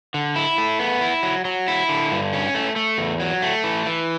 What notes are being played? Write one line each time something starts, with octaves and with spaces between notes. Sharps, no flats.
D3
E4
A3
B3
E4
F#3
F#3
E4
D3
G2
C#4
A3
A3
E2
F#3
A3
E3
E3